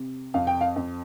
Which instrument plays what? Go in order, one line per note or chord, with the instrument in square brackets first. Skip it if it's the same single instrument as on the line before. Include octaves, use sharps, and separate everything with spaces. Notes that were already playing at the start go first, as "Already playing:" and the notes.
Already playing: [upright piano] C3
F2 F5
G5
F5
F2